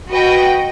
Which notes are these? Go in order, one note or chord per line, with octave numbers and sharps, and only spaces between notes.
F#4 B4 D#5 G5